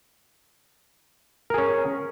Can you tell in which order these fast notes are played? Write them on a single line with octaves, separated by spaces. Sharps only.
A#4 G#4 C#4